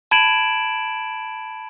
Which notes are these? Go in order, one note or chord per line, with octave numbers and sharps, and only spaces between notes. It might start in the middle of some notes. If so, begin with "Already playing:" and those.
A5 B5 G#6 D7 E7 F#7